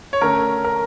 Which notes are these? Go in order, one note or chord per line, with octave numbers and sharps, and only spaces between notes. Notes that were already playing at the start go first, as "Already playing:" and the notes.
C#5
D3 A3 C#4 A#4
A#4